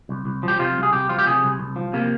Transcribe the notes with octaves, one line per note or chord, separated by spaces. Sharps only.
C2
C2
F3 G4
C3 F4
C2
G#4
C2 G4
F3 F4
G4
C3 G#4
C2
C2
F3
C3 A#3